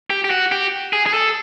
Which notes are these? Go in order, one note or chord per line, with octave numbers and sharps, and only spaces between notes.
G4
G4
F#4
G4
G#4
G#4
A4